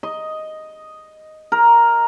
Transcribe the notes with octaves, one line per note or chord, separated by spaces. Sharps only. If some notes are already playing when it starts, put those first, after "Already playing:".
D#5
A#4